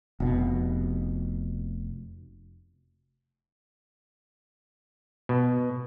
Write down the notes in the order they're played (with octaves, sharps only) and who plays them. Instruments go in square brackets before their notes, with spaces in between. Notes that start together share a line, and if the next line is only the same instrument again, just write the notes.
[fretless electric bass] F1 B2
[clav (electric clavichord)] B2